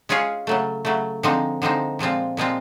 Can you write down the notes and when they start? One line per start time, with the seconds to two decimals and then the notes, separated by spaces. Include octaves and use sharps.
0.09 G#3 C#4 F4 G#4 C#5
0.47 C#3 F#3 A3
0.85 C#3 F#3 A3
1.23 D3 F3 G#3 C4 D#4
1.62 D3 F3 G#3 C4 D#4
1.99 A#2 F3 G#3 C4 F4
2.37 A#2 F3 G#3 C4 F4